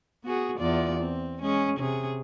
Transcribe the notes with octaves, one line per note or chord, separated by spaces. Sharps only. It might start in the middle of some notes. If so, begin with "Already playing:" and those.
B3 F#4 G#4
E2 F4 D5
C4
G#3 C#4 G#4
C3 C#4 G#4